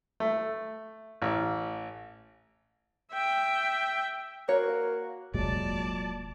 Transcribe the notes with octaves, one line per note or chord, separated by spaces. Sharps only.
A3
A1
E5 G5
A#3 F#4 C#5
F1 D#2 A#2 F#3 G#3 D5 A5